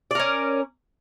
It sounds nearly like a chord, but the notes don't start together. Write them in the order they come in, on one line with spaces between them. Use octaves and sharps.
D5 A#4 C#4